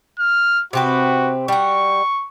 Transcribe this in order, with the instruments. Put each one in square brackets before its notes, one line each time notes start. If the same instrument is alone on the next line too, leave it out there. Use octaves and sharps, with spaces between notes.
[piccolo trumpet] F6
[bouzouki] C3 C4 B4 [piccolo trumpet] F#4
[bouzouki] G3 F#4 [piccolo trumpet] C#6